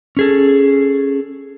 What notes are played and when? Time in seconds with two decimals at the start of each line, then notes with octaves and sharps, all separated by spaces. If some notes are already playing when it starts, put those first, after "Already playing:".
0.17 C#4 G#4 A4